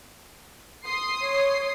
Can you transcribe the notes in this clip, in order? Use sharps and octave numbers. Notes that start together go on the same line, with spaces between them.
C6 D#6 C7
C#5